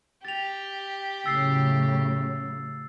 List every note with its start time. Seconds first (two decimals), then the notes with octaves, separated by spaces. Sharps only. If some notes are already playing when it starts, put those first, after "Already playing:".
0.25 G4 A6 F7
1.26 A2 C#3 F#3 E6 A6 C7